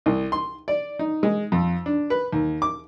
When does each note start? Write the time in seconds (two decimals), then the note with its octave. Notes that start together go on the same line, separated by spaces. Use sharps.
0.06 C2
0.32 C6
0.68 D5
0.99 D#4
1.23 G#3
1.52 F2
1.86 D4
2.10 B4
2.33 D#2
2.62 D6